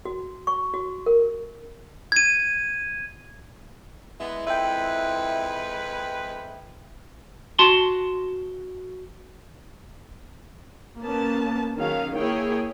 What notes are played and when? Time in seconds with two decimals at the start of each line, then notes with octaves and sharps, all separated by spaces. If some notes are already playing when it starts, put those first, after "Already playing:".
0.05 F#4
0.47 C#6
0.74 F#4
1.06 A#4
2.12 G#6 D#7
4.20 G#3 B3 E4
4.47 F2 G#3 B4 E5 G5
7.59 F#4 A5 C6
11.00 A#3 B3 C#4 A5
11.76 D#3 F#3 C#4 G#4 F5
12.16 A#3 E4 G#4 C#5 G5